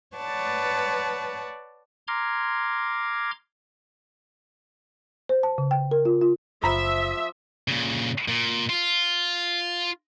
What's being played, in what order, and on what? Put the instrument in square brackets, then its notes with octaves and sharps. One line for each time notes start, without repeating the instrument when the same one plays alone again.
[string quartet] B4 C#5 D5 F#5 A5
[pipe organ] A#5 C6 D6 F6 G#6
[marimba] C5
A5
C#3
G5
A#4
F4
F4
[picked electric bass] F#1 [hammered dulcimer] F3 [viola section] E5 [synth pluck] A#5 B5
[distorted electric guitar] A#2 C#3
A#2
F4